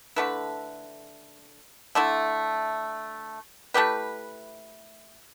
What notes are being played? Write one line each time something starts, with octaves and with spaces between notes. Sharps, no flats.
D3 A3 E4 B4
D3 A3 E4
A3 E4 G4 B4